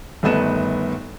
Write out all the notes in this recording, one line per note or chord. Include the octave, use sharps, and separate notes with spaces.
G1 D#3 A3 B3 E7